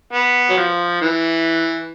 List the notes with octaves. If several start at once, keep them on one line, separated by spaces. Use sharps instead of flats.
B3
F#3
F3
E3